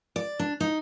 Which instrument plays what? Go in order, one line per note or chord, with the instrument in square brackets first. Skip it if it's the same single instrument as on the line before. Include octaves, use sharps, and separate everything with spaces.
[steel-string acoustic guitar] D5
D4
D#4